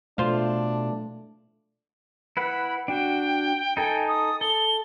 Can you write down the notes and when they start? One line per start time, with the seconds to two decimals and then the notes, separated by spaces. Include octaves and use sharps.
0.18 B2 A3 D4 F4 C5 F5
2.37 E4 B4 F#5 B5
2.88 D4 F#4 G5
3.77 D#4 A4 G5 G#5
4.08 D#6
4.41 A4 G7